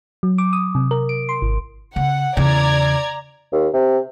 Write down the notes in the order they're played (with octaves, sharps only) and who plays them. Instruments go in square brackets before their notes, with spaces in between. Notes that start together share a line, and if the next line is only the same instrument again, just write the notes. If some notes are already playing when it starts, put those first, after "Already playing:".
[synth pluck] F#3
D6
D#6
C3
A#4
D7
C6
G#1
[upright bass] C#3 [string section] F#5
[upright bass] E2 C#3 [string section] D5 A#5 G#6
[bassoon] D#2
C3